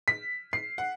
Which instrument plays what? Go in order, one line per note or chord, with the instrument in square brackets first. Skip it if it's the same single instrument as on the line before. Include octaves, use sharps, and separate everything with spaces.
[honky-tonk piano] B6
C7
F#5